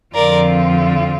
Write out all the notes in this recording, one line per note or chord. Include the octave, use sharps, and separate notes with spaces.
F2 D3 F3 C4 F4 A#4 D5